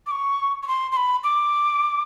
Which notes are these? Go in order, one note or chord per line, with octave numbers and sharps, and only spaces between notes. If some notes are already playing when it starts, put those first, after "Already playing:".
D6
C#6
C#6
C6
C6
B5
D6